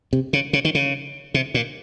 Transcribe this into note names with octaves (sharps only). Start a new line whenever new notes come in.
C3
C#3
C#3
D#3
C#3
C3
A#2